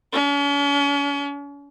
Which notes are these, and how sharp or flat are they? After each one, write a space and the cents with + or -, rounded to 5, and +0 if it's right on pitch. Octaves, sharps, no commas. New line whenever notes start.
C#4 +40